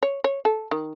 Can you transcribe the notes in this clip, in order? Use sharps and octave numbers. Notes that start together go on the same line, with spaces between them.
C#5
C#5
A4
D#3